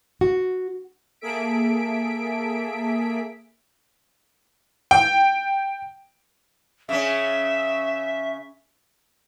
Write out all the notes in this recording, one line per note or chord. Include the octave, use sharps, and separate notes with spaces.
F#4
A#3 G#4 A4 E5 B6 D7
G5
C#3 C#4 E5